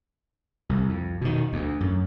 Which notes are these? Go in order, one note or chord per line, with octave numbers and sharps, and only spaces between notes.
C2
F2
B2 D#3
D2
F#2